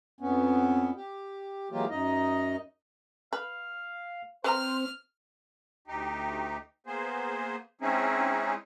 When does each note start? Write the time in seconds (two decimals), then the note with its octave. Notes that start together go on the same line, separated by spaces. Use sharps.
0.20 F2 B3 C#4
0.96 G4
1.71 E3 F#3 G#3 A#3 F4 G4
1.90 F#2 D#4 D#5
3.33 B4 F5
4.44 C4 B4 C5 A#5 F6
5.88 D2 D#4 G4
6.86 A#3 B3 G#4 C5
7.81 G#3 C4 C#4 D#4 E4 G#4